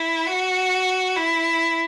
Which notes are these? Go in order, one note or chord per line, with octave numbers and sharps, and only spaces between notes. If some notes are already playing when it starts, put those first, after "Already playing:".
Already playing: E4
F#4
E4